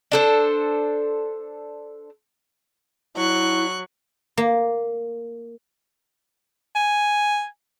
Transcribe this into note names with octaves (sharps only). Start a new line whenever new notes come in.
D4 A4 C5
F#3 E4 C#6 F#6
A#3
G#5